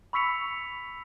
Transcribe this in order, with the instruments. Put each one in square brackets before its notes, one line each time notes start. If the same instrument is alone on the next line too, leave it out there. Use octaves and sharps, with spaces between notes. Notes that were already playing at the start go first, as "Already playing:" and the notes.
[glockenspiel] B5 C#6 E6 B6 C#7 F7